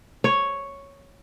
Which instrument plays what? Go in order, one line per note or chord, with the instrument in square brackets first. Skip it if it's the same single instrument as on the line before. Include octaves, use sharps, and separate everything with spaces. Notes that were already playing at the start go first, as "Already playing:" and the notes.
[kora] C#5